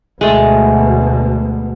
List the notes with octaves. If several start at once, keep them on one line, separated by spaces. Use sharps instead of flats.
D2 B2 G#3 A3